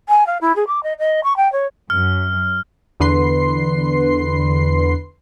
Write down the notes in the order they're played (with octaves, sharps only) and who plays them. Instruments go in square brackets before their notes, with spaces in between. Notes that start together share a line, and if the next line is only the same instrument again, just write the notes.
[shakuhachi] G#5
F5
E4
G#4
D6
D#5
D#5
C#6
G5
C#5
[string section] F#2 [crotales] F6
[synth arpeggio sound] E2 D3 B4 C6 C7